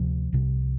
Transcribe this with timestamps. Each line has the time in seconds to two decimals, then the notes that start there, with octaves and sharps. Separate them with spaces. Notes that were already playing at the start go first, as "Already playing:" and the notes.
Already playing: D2 C3 F3
0.33 C2 C3